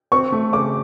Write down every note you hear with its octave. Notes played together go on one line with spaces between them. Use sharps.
C4 C#6
A3
C#3 D6